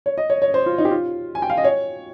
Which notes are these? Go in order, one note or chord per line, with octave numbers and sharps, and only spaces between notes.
C#5
D#5
C#5
C#5
C5
F4
D#4
G4
F4
G#5
G5
F5
D#5
C#5